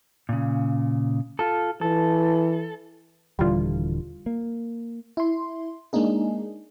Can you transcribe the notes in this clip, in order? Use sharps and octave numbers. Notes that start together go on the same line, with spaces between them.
A#2 C#3
F4 A4
E3 A4
D#1 D3 E3 G3 F4
A#3
E4 C6
G#3 A#3 D4 D#4 G#4